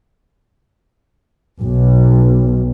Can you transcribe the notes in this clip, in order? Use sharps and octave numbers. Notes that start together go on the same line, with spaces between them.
B1